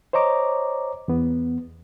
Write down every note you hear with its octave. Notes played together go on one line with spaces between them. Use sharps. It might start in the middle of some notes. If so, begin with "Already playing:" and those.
C5 C#5 D#5 A#5 D6
E2 B3